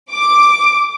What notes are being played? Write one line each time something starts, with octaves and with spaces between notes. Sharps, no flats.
D6